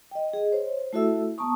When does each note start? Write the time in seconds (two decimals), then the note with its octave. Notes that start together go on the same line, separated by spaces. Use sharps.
0.11 D#5 G5
0.33 G#4 D#5
0.52 C5 C#5
0.93 A3 E4 F#4 A4 E5 E6
1.38 B3 A5 A#5 C#6 D#6